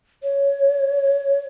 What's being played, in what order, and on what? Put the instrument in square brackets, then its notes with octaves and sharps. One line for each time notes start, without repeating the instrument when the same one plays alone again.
[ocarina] C#5